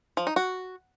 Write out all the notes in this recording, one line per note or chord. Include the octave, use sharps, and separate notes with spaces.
F3
D#4
F#4